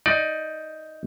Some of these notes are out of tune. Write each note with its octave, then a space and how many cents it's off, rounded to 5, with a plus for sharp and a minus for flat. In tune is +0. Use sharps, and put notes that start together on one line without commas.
D#4 +10 D5 +20